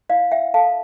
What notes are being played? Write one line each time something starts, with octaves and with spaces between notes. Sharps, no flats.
E4 D5 F5
E5 G5
A4 F5 A5